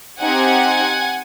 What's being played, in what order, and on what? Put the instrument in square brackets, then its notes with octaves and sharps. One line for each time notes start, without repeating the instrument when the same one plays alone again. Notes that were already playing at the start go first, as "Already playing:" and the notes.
[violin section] C4 D#4 G4 F#5 G#5